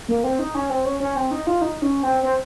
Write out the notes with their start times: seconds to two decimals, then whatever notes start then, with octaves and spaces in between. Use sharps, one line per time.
0.09 A#3
0.24 C4
0.39 D#4
0.55 C#4
0.70 C4
0.85 C#4
1.00 C#4
1.16 C4
1.31 D#4
1.47 F4
1.62 D#4
1.82 C#4
2.03 C4
2.23 C4